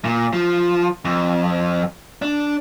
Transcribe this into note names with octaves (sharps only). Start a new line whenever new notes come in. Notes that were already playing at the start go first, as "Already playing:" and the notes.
A#2
F3
F2
D4